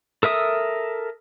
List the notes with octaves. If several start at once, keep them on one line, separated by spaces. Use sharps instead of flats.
A4 A#4 E5 D#6